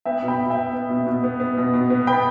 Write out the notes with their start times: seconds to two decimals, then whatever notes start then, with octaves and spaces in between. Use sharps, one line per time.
0.05 B3 E5 G5
0.23 B2
0.28 G5 B5
0.39 B2
0.50 E5 G5
0.56 B3
0.73 B3
0.89 B2
1.07 B2
1.24 B3
1.40 B3
1.57 B2
1.73 B2
1.90 B3
2.07 B3 G5 B5